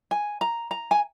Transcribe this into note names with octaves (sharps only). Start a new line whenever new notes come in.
G#5
A#5
A#5
G#5